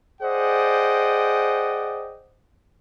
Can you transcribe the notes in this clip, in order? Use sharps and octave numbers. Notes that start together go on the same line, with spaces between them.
G#4 C5 D5 D#5 F#5 G5